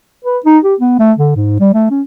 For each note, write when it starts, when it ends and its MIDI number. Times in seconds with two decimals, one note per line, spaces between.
0.25 0.38 71
0.45 0.58 63
0.64 0.75 67
0.80 0.94 59
0.99 1.12 57
1.18 1.31 50
1.36 1.58 44
1.60 1.72 55
1.74 1.89 57
1.91 2.02 61